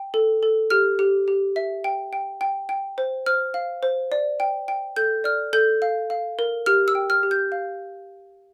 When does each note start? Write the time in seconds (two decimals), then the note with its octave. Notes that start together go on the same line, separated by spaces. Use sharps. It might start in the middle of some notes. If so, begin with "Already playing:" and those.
Already playing: G5
0.14 A4
0.43 A4
0.70 G4 F6
0.99 G4
1.28 G4
1.56 E5
1.84 G5
2.13 G5
2.41 G5
2.69 G5
2.98 C5
3.26 C5 F6
3.54 F5
3.83 C5
4.12 D5
4.40 G5
4.68 G5
4.96 A4 G6
5.24 D5 F6
5.53 A4 G6
5.82 F5
6.10 F5
6.39 A#4
6.66 G4 F6
6.88 E6
6.95 G5
7.10 F6
7.23 G4
7.31 G6
7.52 F5